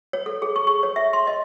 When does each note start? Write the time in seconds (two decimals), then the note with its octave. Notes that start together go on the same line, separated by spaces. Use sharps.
0.13 C#5
0.26 A4
0.42 G#4
0.56 C#6
0.67 C#6
0.83 C#5
0.96 E5
1.13 C6
1.27 D#5